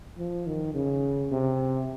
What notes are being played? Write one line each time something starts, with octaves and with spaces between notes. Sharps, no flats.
F3
D#3
C#3
C3